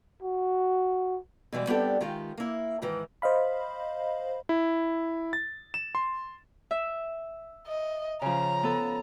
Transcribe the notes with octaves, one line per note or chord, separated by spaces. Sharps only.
F#4
B2 E3 G3 G#3
G3 B3 C4 D4 G4 A4
D#3 G#3 F4 G4
A#3 E4
G#2 D#3 E3
C5 D#5 F5 B5
E4
A6
E7
C6
E5
D#5
C#3 F3 A#5
B3 A4